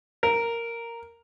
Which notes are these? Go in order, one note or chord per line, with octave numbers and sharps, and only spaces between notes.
A#4